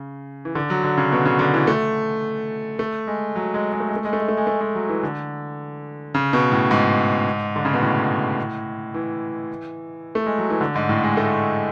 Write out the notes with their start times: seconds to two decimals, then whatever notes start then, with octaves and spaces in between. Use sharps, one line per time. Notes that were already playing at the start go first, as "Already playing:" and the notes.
Already playing: C#3
0.45 E3
0.55 D3
0.70 F#3
0.84 D3
0.97 C#3
1.12 B2
1.25 C#3
1.39 D3
1.54 E3
1.67 A3
2.79 A3
3.07 G#3
3.35 F#3
3.54 G#3
3.73 G#3
3.80 A3
3.89 G#3
3.96 A3
4.05 G#3
4.13 A3
4.20 G#3
4.28 A3
4.37 G#3
4.47 A3
4.61 G#3
4.75 F#3
4.89 E3
5.03 D3
6.14 C#3
6.33 B2
6.52 A2
6.71 G#2
7.56 D3
7.65 C#3
7.74 B2
7.82 A2
8.94 E3
10.15 A3
10.26 G#3
10.38 F#3
10.50 E3
10.61 D3
10.75 G#2
10.89 A2
11.03 G#3
11.17 A3